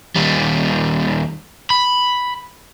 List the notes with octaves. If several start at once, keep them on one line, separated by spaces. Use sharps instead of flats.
D#2 G3
B5